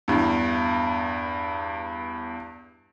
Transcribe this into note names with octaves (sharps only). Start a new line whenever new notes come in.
E2 G2